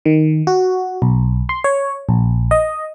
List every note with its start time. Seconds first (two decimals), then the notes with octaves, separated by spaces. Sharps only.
0.06 D#3
0.47 F#4
1.02 B1
1.49 C6
1.64 C#5
2.09 A#1
2.51 D#5